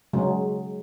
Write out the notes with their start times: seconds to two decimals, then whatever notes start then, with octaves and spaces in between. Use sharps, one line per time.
0.13 C#3 F#3 G#3